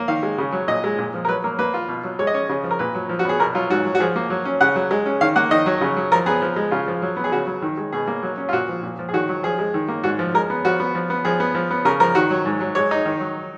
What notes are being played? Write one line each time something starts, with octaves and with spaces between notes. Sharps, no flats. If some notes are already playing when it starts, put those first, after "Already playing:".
Already playing: A#3
D#3 F5
G#3
C#3
F#3
A#2 D#5
G#3
A#2
F3
A#4
F#3 B4
A#3 A#4
A#3 B4
F4
B2
F#3
G#3 C#5
D#5
C#4 C#5
C#3
F3
A#4
A#2 B4
F#3
F3
F#4
B3 G#4
B2 A#4
F#3 F4
G#2 F#4
F#3
F#4
F3 G#4
A#3
F#3
C#4
C#3 F#5
F#3
G#3
C#4
D#3 F5
A#3 F#5
D#3 D#5
F#3
C#3
F#3
F3 A#4
B3 G#4
F3
G#3
C#3 F4
F3
F#3
B3
G#4
C#3 F#4
F#3
D#3
G#3
B2 G#4
A#3
F#3
C#4
F4
A#2 F#4
F3
A#2
F3
G#4
D#3 F#4
F#3
F3 G#4
G#3
D#3
A#3
G#2 F#4
F3
G#3 A#4
B3
F3 F#4
B3
F3
B3
F3 G#4
B3
F3
B3
C#3 A#4
F3 A#4
D#3 F#4
F#3
G#2
F#3
G#3 C#5
D#4
D#3
F#3